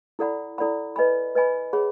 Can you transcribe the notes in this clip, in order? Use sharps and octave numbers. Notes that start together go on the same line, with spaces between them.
E4 A4 D5 F#5 B5
E4 A4 D5 F#5 B5
B4 D#5 G#5 B5
B4 D#5 G#5 B5
G#4 C#5 F#5 B5